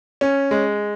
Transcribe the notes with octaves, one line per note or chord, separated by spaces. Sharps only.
C#4
G#3